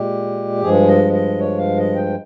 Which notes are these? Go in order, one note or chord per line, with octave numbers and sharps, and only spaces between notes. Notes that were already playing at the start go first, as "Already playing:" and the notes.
Already playing: A#2 G#3 G4
G2 F3 G#3 G#4
D#5
D#5
C#5
F5
D#5
G5